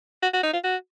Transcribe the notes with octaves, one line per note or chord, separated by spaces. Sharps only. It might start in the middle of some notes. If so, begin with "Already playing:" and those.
F#4
F#4
D#4
F4
F#4